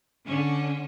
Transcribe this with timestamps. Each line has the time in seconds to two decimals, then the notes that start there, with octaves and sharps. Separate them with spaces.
0.24 D3 C#4